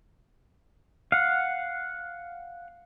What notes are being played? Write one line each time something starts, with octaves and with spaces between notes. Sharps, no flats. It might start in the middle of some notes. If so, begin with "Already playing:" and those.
F5 F#5